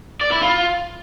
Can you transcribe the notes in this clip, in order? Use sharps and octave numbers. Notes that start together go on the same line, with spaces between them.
D5
E4
F4